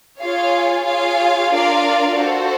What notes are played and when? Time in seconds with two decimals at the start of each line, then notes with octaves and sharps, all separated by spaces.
0.19 F4 G#4 C#5 F5
0.84 F4 G#4 C#5 F5
1.50 D4 F4 A#4 D5 F5
2.16 F#4 A4 C5